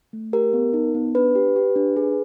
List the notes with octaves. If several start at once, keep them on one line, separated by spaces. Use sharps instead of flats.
A3
G4 A#4
B3
D#4
B3
D4 B4
G4
G4
D4
G#4